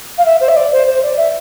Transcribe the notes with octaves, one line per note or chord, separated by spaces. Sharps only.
F5
E5
C5
E5
D5
C5
C5
D5
E5